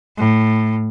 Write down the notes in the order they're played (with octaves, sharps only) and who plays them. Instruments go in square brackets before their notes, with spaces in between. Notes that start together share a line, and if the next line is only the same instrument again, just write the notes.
[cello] A2